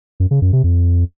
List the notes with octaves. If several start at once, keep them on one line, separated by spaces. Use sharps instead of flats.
F#2
C#3
F#2
C3
F2